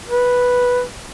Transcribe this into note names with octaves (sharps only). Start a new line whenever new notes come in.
B4